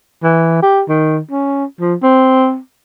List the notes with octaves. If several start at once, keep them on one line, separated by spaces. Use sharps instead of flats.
E3
G4
D#3
C#4
F3
C4